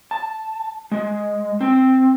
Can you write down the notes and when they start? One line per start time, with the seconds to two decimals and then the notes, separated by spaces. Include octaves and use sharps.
0.11 A5
0.92 G#3
1.61 C4